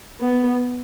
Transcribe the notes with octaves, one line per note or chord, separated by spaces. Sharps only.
B3